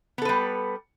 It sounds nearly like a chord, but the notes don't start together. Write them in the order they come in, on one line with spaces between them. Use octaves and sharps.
B3 A4 B4 G3